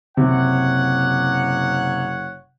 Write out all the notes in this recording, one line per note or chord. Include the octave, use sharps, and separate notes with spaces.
F#1 C3 C#5 F#5